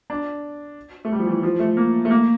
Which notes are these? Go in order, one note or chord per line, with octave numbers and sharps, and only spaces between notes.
D4
A3
G3
F3
E3
F3
A3
A#3
A3
A#3